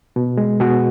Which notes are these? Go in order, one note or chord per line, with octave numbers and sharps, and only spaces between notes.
B2
G#3
B2 F#4 G#4